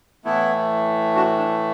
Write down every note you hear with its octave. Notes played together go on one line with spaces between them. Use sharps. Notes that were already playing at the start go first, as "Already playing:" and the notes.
A2 E3 A3 B3 E4
D4 F#4
D4